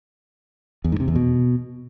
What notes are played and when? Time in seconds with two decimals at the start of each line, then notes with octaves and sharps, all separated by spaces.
0.84 E2
0.92 G#2
1.00 C3
1.08 E2
1.16 B2